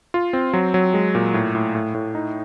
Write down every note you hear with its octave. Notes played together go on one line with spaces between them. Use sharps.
F4
C4
F#3
F#3
G#3
A#2
A2
A2
A2
A2
D#4